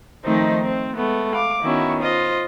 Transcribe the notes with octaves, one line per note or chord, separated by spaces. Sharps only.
D#3 F3 A3 C4 D#4 C5
C4
G#3 A3 B3
F5 D6
D#3 B3 C#4 E4 F#4
F4 C5 D#5